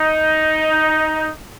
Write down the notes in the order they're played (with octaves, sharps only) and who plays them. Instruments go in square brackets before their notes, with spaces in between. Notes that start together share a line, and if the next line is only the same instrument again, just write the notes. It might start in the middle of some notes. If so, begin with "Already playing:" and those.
Already playing: [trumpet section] D#4